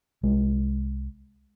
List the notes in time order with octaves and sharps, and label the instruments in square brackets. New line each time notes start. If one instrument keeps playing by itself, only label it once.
[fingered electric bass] C2 G#3